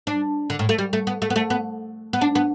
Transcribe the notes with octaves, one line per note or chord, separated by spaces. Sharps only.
D4
D3
A2
A3
G3
A3
B3
A3
B3
A3
B3
B3
D4
B3